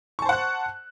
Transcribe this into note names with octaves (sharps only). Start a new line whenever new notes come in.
C5 F#5 A5 C#6 F#6